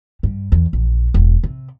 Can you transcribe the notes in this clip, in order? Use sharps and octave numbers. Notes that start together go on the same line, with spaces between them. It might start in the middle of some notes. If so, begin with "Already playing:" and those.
G2
E2
A#1
E1
C3